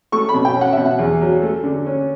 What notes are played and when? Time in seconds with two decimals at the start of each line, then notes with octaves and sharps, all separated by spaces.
0.12 A3 C#6
0.29 B5
0.34 B2
0.45 G5
0.56 C#4
0.61 F#5
0.73 B2 E5
0.85 F#5
0.99 E2
1.21 F#3
1.42 A3
1.64 D3
1.86 C#4